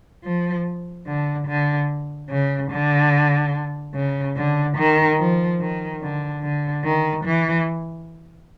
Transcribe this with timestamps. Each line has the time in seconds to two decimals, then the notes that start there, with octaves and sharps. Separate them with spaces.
0.24 F3
1.07 D3
1.47 D3
2.30 C#3
2.71 D3
3.94 C#3
4.36 D3
4.77 D#3
5.19 F3
5.60 D#3
6.02 D3
6.43 D3
6.84 D#3
7.25 E3